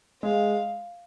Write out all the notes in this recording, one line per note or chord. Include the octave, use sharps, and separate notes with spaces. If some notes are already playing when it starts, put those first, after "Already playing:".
G#3 F5